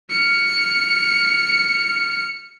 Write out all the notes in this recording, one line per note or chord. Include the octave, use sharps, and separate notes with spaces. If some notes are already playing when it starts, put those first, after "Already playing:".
F6 C#7